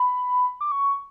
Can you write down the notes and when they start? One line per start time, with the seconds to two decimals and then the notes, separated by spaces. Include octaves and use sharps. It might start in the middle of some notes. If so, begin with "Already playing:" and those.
Already playing: B5
0.61 D6
0.72 C#6